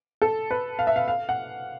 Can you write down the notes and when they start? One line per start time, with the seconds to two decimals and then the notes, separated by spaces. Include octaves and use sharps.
0.22 A4
0.51 B4
0.79 F5
0.87 E5
0.96 F5
1.08 F5
1.29 F#5